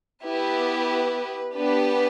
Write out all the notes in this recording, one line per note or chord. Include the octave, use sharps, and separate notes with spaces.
B3 E4 G4 B4
B3 D4 G4 B4